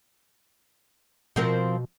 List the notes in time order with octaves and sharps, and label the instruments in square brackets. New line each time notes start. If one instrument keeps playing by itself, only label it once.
[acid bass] B2 [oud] F3 C4 A#4